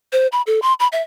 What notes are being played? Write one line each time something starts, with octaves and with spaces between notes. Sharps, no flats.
C5
B5
A4
C6
B5
E5